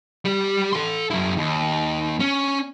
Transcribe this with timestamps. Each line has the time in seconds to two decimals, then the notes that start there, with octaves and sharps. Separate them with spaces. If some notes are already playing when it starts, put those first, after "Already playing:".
0.25 G3 G4
0.73 A4 C6
1.10 F#2 E4
1.37 D#2
2.20 C#4